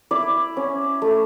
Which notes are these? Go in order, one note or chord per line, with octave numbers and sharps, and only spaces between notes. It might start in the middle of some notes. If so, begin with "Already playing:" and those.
E4 D5
C#4
A3